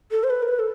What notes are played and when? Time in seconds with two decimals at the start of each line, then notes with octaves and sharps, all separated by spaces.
0.11 A4
0.24 C5
0.30 B4
0.42 A#4
0.48 B4
0.59 A4